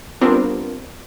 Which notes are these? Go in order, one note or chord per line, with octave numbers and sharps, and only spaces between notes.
G3 B3 C4 D4 F4 A#4